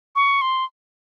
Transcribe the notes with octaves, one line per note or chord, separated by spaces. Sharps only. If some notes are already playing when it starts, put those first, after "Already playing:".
C#6
C6